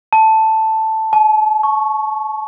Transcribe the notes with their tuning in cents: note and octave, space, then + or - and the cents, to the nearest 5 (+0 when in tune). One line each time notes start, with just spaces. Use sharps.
A5 +0
A5 -45
C#6 -5